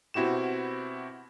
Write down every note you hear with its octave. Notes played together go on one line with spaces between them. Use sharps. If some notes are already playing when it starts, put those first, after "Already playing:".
B2 C4 E4 F#4 G4 E7